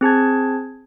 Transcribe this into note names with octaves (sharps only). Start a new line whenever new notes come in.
C4 G#4 A5 G#6